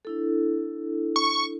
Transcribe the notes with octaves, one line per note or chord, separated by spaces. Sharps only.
D4 E4 A4
C#6